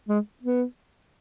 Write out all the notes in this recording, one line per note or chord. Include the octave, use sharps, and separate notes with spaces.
G#3
B3